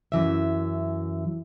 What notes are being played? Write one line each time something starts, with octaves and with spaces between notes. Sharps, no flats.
F#2 E3 E5